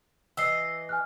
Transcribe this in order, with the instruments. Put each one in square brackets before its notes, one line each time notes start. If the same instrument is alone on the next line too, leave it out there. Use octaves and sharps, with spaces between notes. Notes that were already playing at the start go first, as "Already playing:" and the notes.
[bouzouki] E3 D#5 [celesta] E6 C7
[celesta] G#5 F6 F#6